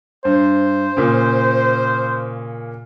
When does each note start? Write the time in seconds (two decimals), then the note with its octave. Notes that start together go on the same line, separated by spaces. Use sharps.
0.25 G2 C5
0.97 A#2 C#3